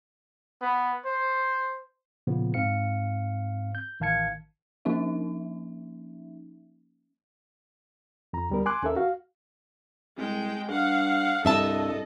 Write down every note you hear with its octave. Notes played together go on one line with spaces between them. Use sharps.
B3
C5
A#2 C#3 F3 B3
G#2 C4 F5 C#7
G6
A1 D#3 F5 A5 G#6 C#7
F3 A#3 C#4 D#4 E5
F2 A#5
D2 G3 B3 A#4
G#5 C6 D6 F#6
D#2 C#4 A4 A#4 E5
F#4 F5
C2 G#3 G5
G2 F5 F#5
C2 G2 A4 D#5 E5 A5